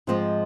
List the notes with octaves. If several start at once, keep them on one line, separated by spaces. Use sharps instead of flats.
G#2 F3 G#3 C4 F4